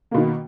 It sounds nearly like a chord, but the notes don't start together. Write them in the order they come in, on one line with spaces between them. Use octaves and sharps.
A#3 B2 D#3